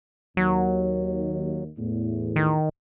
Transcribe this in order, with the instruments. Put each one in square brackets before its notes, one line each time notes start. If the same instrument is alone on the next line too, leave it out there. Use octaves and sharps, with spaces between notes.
[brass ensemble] D#2 [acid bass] F#3
[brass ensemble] E2 A2
[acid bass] D#3